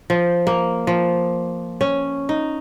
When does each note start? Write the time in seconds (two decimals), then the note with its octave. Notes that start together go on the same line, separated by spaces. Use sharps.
0.10 F3
0.47 A#3
0.87 F3
1.81 C#4
2.29 D#4